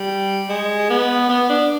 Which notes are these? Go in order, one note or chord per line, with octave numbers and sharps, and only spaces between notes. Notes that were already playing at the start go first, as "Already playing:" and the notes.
Already playing: G3
G#3
B3
B3
D4